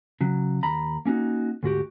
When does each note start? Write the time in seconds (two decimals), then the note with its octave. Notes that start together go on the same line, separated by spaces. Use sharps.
0.21 C#3 F#3
0.63 D#2 A#5 B5
1.05 A#3 C#4 D#4 F#4
1.63 D2 G#2 F#4 G4